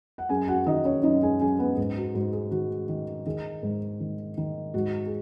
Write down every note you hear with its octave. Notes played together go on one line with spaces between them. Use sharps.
F#5
F#2 G#4 G#5
F#4 F#5
D#3 D#4 D#5
C#4 C#5
F#2 D#4 D#5
G#4 G#5
F#2 G#4 G#5
B3 B4
G#2 G#4
F#4
G#2 F#4
G#4
D#3 F#4
D#3
D#3 G#4
G#2
D#3
D#3
G#2 F#4
G#4